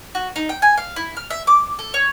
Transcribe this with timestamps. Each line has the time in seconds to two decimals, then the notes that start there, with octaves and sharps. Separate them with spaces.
0.15 F#4
0.36 D#4
0.49 G5
0.62 G#5
0.77 F5
0.96 E4
1.17 F6
1.30 E5
1.47 D6
1.79 A4
1.94 C#5